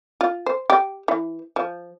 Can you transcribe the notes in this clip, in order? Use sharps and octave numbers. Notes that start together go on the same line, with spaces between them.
F4
C5
G4
E3
F3